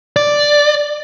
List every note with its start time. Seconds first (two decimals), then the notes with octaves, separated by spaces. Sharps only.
0.16 D5